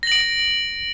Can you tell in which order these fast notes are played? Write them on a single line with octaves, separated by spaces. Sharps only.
A#6 F#7 D7